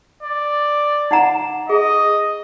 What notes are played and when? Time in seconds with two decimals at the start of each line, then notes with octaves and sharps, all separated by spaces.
0.23 D5
1.11 D#4 F#5 A#5
1.69 G#4 D#5